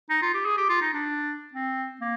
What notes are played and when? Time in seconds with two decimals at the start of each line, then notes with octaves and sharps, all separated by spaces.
0.10 D#4
0.22 F4
0.35 G4
0.46 G#4
0.57 G4
0.69 F4
0.81 D#4
0.94 D4
1.54 C4
2.01 A#3